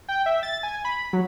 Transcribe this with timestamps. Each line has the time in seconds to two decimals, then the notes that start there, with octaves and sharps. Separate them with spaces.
0.08 G5
0.26 E5
0.43 A6
0.63 G#5
0.85 B5
1.13 F#3